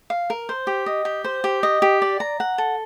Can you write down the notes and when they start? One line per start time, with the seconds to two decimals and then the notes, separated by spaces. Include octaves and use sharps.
0.10 F5
0.30 A#4
0.49 C5
0.67 G4
0.86 D#5
1.05 G4
1.24 C5
1.44 G4
1.63 D#5
1.82 G4
2.02 D5
2.20 A#5
2.40 F#5
2.58 A4